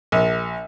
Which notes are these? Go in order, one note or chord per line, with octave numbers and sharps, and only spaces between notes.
A#1